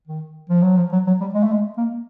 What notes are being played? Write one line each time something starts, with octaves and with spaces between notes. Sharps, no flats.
D#3
F3
F#3
F3
F#3
F#3
G3
G#3
A3
G#3
A#3